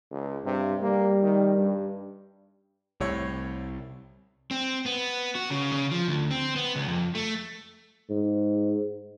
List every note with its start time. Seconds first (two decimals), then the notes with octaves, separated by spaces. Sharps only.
0.11 C#2
0.45 G2 C3
0.81 G3 A#3
1.23 D#3
1.57 G2
3.00 C2 A2 C#5
4.51 C4
4.86 B3
5.35 F#4
5.50 C#3
5.72 C#3
5.91 F3
6.08 D2
6.31 C4
6.56 B3
6.76 C#2
6.88 F2
7.15 A3
8.10 G#2